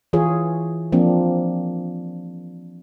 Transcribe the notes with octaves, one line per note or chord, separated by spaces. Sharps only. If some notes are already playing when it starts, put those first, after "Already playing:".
E3 F4 G#4 C#5
F3 A#3 C4 D4